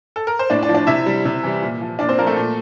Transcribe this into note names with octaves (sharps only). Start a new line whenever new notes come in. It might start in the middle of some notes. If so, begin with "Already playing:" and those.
A4
A#4
C5
A2 D4 D5
D4 D5
F3
D4 D5
C3 E4 E5
G3
C3
E3 G3
A#2
F3
A#2 D4 D5
C4 C5
F3 A#3 A#4
A3 A4
A#2